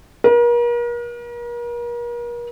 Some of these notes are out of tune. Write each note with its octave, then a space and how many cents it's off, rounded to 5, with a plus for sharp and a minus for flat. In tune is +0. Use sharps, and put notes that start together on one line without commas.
A#4 +40